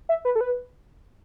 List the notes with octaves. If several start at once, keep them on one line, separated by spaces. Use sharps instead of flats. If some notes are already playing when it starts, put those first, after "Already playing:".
E5
B4
A4
B4